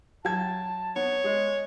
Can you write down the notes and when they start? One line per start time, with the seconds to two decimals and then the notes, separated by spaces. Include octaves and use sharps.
0.25 F#3 F5 G5 A5 G#6
0.96 B3 C#5
1.24 G#3 G#4